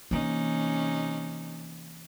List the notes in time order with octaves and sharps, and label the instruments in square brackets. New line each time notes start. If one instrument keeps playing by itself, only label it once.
[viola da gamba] C3 C#4 D#4 [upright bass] E3 A#3